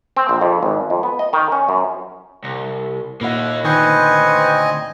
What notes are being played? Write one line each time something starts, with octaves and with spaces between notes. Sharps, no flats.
C4
A#1
F2
G#1
F2
B3
D#5
D#3
C#4
F#2
C2
A#2 A#3 D#4 E4 F#5
D2 D#3 C4 B4 C5 D#5 G#5 C#6